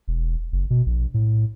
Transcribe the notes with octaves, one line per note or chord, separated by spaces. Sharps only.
E1
F#1
B2
A#1
A2